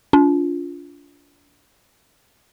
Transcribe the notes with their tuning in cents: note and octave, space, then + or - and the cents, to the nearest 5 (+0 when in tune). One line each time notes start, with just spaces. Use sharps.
D4 -40 F4 +0